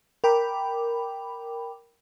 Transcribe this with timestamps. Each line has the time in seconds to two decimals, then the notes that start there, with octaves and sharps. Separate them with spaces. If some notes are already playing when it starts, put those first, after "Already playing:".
0.24 A#4 G5 B5 D6